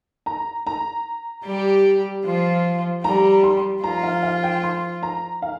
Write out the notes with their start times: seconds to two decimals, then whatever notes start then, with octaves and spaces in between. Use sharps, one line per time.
0.26 A#5
0.67 A#5
1.45 G3 G4
2.25 F3 F4
3.04 G3 G4 A#5
3.43 C6
3.83 F3 F4 A#5
4.03 F5
4.23 F5
4.43 G5
4.63 C6
5.03 A#5
5.42 F5